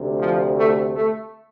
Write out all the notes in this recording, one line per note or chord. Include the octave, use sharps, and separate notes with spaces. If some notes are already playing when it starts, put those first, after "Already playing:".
Already playing: D2 C3
F3
A3
A3